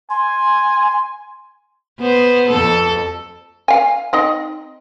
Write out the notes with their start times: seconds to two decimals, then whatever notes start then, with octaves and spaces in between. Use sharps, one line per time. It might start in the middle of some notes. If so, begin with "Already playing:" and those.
0.10 G#5 C6
2.00 B3 C5
2.49 F2 A4
3.68 F5 G#5
4.13 C4 D#4 D#5